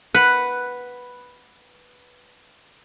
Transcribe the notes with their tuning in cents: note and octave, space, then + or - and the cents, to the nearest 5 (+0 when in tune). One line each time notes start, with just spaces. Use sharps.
B4 +0 F#5 +0